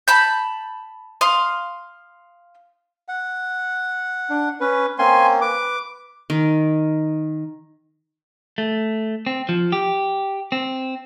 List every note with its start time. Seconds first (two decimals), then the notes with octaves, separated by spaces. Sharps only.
0.08 A5 B5 G6
1.21 F5 C6 D#6
3.08 F#5
4.30 D4
4.61 C#4 B4
4.99 A#3 C4 C#4 G#5 C6
5.41 B4 D6
6.30 D#3
8.58 A3
9.26 C4
9.49 F3
9.72 G4
10.52 C4